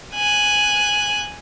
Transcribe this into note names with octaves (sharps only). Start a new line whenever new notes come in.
G#5 F#6